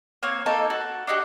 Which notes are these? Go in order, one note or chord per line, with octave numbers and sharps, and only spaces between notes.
A#3 C4 C#5
A#3 D#4 A4
F#4 A5
D4 D#4 F#4 G4